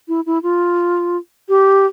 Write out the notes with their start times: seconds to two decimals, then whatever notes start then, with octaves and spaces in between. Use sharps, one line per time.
0.08 E4
0.26 E4
0.43 F4
1.49 G4